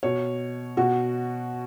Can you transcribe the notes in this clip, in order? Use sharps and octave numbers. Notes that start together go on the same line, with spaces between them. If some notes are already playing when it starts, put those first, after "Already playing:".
B2 C#5
B2 F#4